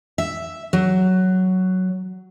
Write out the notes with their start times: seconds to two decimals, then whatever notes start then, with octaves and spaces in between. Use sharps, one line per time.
0.18 E5
0.73 F#3